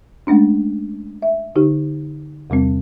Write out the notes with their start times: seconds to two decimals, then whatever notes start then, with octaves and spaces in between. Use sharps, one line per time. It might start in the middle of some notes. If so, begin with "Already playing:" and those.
0.27 G#3 A3 C#4 D4
1.22 E5
1.55 D3 D#4 G4
2.50 E2 C3 G3 C4